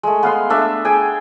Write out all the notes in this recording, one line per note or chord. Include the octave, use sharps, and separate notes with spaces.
G#3 A3
B3 F5 C6
A3 D4 E5
G#4 G5 G#5